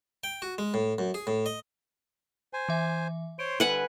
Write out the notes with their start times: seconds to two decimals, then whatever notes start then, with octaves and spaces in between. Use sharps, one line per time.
0.24 G5
0.42 F#4
0.58 G#3
0.74 A2
0.98 F#2
1.14 G#4
1.27 A2
1.46 D#5
2.53 C5 G#5
2.69 E3 E5
3.39 C5 C#5 C6 D7
3.60 D3 G3 B4 F#5 G#5